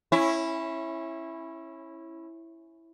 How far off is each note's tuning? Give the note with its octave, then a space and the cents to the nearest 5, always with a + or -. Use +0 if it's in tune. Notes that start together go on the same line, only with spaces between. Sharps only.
C#4 -25 E4 +0